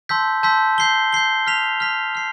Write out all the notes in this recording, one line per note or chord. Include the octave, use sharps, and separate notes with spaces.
A5 C6 E6 G6 B6
A5 C6 E6 G6 B6
G6 C7 G7
G6 C7 G7
F6 B6 F7
F6 B6 F7
F6 C7